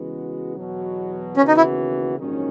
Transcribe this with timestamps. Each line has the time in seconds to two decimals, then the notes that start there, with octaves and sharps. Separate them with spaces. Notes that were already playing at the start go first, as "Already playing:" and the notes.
Already playing: C#3 E3 G#3 B3 F#4
0.56 E2 B2 F#3
1.37 D#2 C#3 E3 B3 C#4 F#4
1.48 D#4
1.57 E4
2.18 A#1 G#2 D#3 F#3 C#4